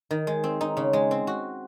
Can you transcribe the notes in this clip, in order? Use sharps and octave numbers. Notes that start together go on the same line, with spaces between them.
D#3
G#3
C4
D#4
C#3
G#3
C4
F#4